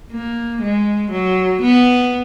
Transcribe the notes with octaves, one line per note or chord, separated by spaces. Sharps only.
A#3
G#3
F#3
B3